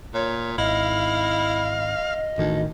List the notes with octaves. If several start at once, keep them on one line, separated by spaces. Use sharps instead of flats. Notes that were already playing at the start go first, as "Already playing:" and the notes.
A#2 C#5
G#1 E4 D#5 F5
A1 D2 D#3